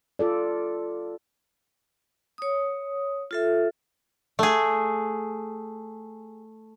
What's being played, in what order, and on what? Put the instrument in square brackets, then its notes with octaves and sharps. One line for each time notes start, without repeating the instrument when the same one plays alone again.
[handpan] F4 A4 D5
[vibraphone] C#5 D#6
F4 A4 E5
[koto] A3 G#4